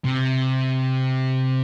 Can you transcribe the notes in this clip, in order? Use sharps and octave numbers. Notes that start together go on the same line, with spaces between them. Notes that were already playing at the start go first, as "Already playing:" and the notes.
C3